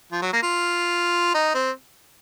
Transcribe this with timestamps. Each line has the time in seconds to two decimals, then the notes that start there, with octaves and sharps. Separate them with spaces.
0.12 F3
0.22 F#3
0.33 A#3
0.43 F4
1.34 D#4
1.55 C4